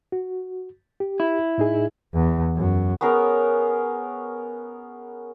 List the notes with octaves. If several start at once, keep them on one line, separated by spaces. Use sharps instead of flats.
F#4
G4
E4
A2 D#4 G#4
E2
F#2
B3 C#4 G#4 A#4